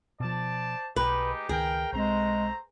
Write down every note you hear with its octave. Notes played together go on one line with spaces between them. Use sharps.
B2 F3 C5 D5 A5
B1 G#3 D#4 G4 B4
C#2 D#3 G#4 A#4 G5
B1 G#3 A3 C4 C5 A#5